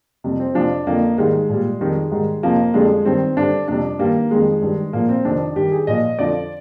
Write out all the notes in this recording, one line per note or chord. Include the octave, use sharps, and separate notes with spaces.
F2 C3 G3
C4
F2 C3 F3 D4
F2 D3 F3 A#3
G#2 D#3 G3 G#3
A#2 G3
F2 D#3 G3
G#2 D#3 G3
F2 C3 F3 A#3
F2 D3 G3 G#3
G2 D#3 G3 C4
G2 D3 G3 D4
F2 C3 G3 D4
G2 D#3 G3 A#3
F2 D#3 G3 G#3
G2 D#3 G3
A#2 F3 A#3
C4
F2 C3 D#3 D4
G2 D#3 G3 G4
G#4
A#2 F3 D#5
F2 D3 F3 D5